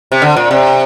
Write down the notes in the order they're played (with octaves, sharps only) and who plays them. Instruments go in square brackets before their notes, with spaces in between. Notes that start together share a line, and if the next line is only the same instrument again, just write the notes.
[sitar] C3
D3
A#2
C3